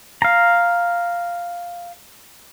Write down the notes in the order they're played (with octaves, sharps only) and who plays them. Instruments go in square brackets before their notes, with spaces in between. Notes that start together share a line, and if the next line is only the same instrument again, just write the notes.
[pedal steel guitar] F5 A#5